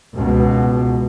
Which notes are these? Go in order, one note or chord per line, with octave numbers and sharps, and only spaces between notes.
C#2 B2